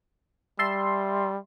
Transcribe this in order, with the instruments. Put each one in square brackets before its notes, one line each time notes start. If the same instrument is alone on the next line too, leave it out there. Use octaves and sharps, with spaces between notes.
[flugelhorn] G3 [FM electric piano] E5 A5 C6